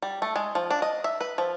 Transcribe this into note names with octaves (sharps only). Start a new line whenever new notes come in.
G3
A3
G#3
F3
D4
D#5
E5
B4
F3